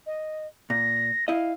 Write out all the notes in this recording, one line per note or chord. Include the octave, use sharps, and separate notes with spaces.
D#5
A#2 A#6
E4 D#5 F5